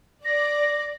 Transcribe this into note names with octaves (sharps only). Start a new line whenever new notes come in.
D5 A#6